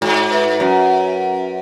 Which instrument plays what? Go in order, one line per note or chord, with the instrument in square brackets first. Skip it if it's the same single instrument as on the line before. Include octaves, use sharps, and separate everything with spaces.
[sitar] G#2 [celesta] F#4
[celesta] B4 E5
[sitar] F#2 [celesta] F#4